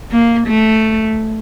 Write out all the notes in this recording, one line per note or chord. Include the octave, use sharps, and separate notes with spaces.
A#3
A3